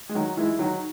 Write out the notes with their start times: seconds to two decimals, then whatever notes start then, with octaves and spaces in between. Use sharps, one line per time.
0.09 G#3
0.15 D#3 F#3
0.37 E3 G#3
0.59 D#3 F#3